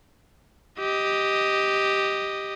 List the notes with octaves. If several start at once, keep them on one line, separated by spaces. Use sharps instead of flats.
G4 D#5